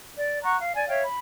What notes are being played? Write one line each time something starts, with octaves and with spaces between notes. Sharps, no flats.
D5
F#5 A#5 C#6 F#6
F5
D5 G#5
C#5 E5 F5 G5
B5